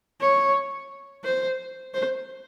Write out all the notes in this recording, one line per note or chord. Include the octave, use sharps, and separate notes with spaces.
C#5
C5
C5